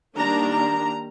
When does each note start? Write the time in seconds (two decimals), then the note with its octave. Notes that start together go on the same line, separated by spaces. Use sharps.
0.16 D#3 G3 A#3 D4 A#5
0.51 A#5